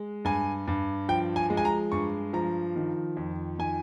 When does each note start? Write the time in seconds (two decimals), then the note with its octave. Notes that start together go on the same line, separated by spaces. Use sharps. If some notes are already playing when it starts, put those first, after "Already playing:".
Already playing: G#3
0.25 G2 G#5
0.68 G2
1.09 F3 G5
1.36 G#5
1.50 G#3
1.57 G#5
1.65 A#5
1.92 G2 C#6
2.33 F3 A#5
2.76 D#3
3.17 F2
3.58 D#3 G#5